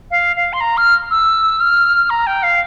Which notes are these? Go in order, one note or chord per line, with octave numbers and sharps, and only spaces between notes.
F5
F5
C6
A#5
F6
E6
F6
A#5
G5
F5